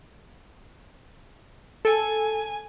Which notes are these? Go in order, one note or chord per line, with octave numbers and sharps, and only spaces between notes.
A4 G#5